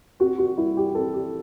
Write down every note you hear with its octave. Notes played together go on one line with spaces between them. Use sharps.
C4 F#4
F#4
G3 E4
G4
C4 A4
G4